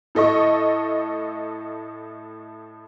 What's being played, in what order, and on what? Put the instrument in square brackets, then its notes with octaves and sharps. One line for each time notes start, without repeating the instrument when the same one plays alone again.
[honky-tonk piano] A2 A4 D#5 C#6